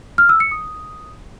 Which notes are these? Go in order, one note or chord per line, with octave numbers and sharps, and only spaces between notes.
F6
E6
C#7
D#6